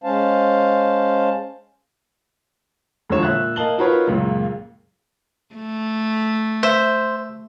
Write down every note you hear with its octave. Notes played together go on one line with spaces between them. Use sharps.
G#3 C#4 C5 F5 A5
E1 F2 D3 F3 C#5 E7
A#2 E5 F#6
A#3 D#5 F5 A5 F#7 G7
D#4 F4 F#4 A#4 B4 C#5
C#2 F#2 A#2 C#3
A3
C5 E5